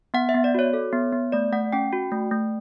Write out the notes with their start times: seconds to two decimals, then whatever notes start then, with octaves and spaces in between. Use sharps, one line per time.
0.14 B3 F#5
0.29 E5
0.35 B3
0.44 D5
0.54 F#4 C#5
0.73 A4
0.93 B3
1.13 B3
1.32 A3 D5
1.52 A3 F#5
1.73 C#4 G5
1.93 F#4
2.12 A3
2.31 A3